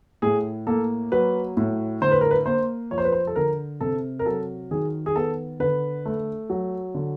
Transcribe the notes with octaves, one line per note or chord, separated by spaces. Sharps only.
A2 G#4
A#3 A4
F#3 B4
A2
D3 C5
B4
A#4
B4
A#3 C5
F3 C#5
C5
B4
C5
A4
D3 A#4
C3 A4
A#4
F#3 A4
D#3 G#4
G#4
B3 A4
D3 B4
A3
F#3
D3